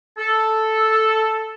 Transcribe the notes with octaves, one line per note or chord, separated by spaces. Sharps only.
A4